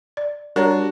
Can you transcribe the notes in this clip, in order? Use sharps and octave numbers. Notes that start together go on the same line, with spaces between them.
D5
G3 D4 F#4 A#4 C#5 A#5